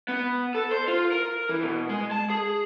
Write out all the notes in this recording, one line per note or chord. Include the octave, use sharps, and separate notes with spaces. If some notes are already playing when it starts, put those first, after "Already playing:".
B3
A4
C5
F4
A#4
E3
B2
G#3
A5
G#4